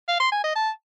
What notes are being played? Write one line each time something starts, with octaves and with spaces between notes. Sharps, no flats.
F5
C6
G#5
D#5
A5